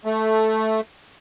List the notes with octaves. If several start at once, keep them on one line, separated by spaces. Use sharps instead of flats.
A3